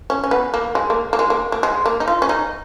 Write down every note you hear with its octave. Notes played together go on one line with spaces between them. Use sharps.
C#4
C#4
B3
A#3
G#3
A#3
A#3
G#3
A#3
A#3
G#3
A#3
D#4
F4
C#4
D#4